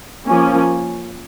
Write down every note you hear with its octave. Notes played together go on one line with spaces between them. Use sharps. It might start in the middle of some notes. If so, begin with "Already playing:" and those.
F3 A#3 C#4